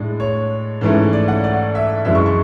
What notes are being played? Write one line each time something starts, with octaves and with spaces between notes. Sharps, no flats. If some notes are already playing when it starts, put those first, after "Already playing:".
Already playing: A2 G#3 D4
C#5
G#2 E3 A3 C#4
D5
F#5
D5
E5
F#2 E3 G#3 D4 E5
C#6
C#6